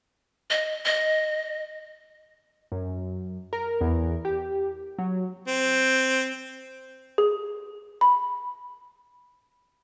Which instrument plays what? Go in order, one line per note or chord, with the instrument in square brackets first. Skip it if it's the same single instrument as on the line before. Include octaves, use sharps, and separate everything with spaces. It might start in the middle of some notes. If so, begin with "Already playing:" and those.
[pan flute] D#5
D#5
[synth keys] F#2
A#4
E2
G4
F#3
[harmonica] C4
[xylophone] G#4
B5